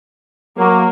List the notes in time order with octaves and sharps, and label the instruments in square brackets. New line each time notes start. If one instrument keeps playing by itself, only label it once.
[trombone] F#3 [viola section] A#3